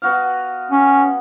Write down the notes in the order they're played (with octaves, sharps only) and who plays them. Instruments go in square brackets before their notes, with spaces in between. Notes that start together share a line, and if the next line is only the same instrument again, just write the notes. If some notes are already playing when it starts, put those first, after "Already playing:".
[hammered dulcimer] B3 F#4 F5
[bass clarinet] C#4